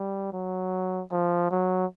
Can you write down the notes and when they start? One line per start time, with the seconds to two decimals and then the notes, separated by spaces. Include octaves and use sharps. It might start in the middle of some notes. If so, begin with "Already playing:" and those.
Already playing: G3
0.32 F#3
1.11 F3
1.51 F#3